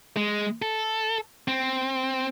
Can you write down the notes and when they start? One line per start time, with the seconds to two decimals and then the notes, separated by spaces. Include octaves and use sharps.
0.16 G#3
0.62 A4
1.48 C4